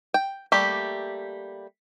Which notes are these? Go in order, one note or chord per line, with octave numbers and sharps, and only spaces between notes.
G5
G3 A3 A#3 G4